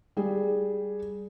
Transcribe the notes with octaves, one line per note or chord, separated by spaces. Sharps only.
G3 G#4